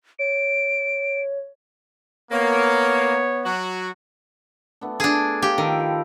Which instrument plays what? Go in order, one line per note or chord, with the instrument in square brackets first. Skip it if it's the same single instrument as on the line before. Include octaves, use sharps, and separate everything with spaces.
[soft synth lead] C#5 [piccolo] D7
[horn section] A#3 [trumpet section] B3 C#5
[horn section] F#3 F#4
[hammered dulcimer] A3 B3 D4
[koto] D4 G#4 [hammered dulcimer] A4 D5 A5
[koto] G4 [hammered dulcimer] F5 G5
[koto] D#3 [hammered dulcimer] F3 A4 A#4
[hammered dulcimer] B5